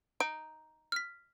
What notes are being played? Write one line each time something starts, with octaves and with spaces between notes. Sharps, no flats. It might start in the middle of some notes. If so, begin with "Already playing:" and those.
D#4 D7
F6 B6